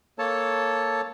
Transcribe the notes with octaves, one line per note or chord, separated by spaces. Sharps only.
A#3 A4 C#5 A5